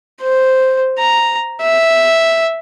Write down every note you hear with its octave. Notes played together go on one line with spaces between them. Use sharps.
C5
A#5
E5